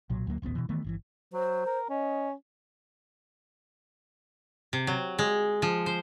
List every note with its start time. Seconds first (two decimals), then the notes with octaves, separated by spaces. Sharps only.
0.10 B1 A#2 F#3
0.27 D2 F#3 A3 A#3
0.42 D#1 A1 D2 B3
0.55 B2 E3
0.69 D#3 E3 A3 B3
0.84 G1 B2 E3
1.33 F#3 C5
1.66 A#4
1.90 C#4 D#5
4.73 C3
4.87 F#3
5.19 G#3
5.62 F3
5.86 C5